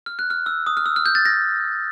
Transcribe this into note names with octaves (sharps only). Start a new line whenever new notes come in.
F6
F#6
F6
E6
D#6
F6
E6
F6
G6
A6
A#6